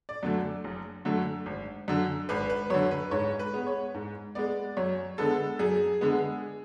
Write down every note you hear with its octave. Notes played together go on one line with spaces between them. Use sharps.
D5
F#2 D3 F#3 A3
F#1
F#2 D3 F#3 A3
G#1
F#2 D3
G#1 B4
B4
F#2 D3 C#5
B4
G#2 C#5
B4
G#3 B3
C#5
G#2
G#3 B3 D5
F#2 C#5
D3 G#3 B3 A4
F#2 G#4
D3 G#3 B3